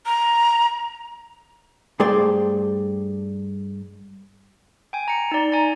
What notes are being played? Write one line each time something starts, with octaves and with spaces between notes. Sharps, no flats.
A#5
G2 A3 G#4 C5 D5 G5
G5 G#5
A#5 C#7
D#4 D5
G#5 A#5